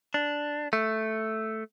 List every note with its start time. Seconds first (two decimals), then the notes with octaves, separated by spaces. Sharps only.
0.14 D4
0.73 A3